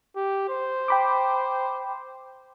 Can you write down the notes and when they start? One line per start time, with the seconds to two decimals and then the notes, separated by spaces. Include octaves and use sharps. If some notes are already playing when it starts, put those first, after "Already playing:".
0.16 G4
0.49 C5
0.88 G5 B5 D6